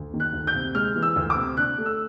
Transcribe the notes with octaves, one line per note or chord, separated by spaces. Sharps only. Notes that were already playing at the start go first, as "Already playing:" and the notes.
Already playing: D2
D#3
F#6
D2
G6
C3
G#3 F6
E3
E6
D2
D6
C3
D4 F#6
A3
E6